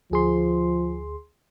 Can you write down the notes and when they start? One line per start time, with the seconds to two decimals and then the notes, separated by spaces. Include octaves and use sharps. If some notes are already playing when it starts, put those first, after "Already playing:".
0.11 D2 F3 G#4 C6